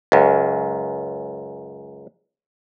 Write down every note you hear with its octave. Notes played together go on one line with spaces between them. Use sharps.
C#2 F#2